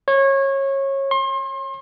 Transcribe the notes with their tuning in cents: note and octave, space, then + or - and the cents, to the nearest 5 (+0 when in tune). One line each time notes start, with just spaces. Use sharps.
C#5 -25
C6 +35